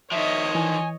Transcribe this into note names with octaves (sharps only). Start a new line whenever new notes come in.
D#3 F3 C#5 D#5 E5
E3 G#5